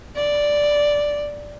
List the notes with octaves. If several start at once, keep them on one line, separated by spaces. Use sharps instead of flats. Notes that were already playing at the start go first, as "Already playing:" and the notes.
D5